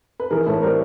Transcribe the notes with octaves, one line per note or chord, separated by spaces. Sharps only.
B4
E3 G#4 A#4
A2 A4 B4
G3 A#4 C5